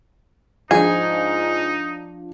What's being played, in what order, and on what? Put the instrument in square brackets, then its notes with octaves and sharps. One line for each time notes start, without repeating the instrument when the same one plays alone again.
[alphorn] G#2 [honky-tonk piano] F3 D4 [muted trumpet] D#4 [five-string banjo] G#4